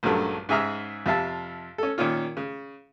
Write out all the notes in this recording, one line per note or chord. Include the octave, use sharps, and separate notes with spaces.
A#1 G2 C#3 F#3 A3
G#2 C#3 G#4 E5 A#5 F6
F2 C3 E5 F5 A5
C#4 A4
A#2 D#3 C#4 F4
C#3